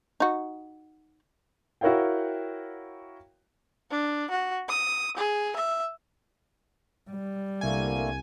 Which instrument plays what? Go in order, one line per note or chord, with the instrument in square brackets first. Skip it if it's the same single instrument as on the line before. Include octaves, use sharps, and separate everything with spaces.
[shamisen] D#4 F#4
[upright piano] E4 F#4 A#4 C#5 F5 G5
[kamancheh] D4
F#4
D#6
G#4
E5
[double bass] G3
[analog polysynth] C2 G#5 [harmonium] D3 A3 A#3